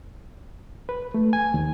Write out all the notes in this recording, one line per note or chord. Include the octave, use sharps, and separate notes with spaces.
B4
A3
G#5
D#2